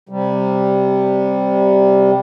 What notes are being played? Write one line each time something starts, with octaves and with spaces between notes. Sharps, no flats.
C3 G3